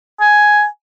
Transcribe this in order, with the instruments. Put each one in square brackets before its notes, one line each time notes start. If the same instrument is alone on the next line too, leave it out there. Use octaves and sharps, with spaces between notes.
[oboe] G#5